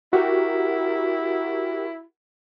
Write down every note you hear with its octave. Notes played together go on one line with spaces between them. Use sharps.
E4 F#4 G4 A#4